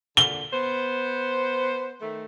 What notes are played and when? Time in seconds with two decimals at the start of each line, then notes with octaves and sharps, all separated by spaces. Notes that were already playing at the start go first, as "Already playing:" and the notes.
0.17 A#2 D3 G7
0.53 B3 C5
2.02 D#3 A3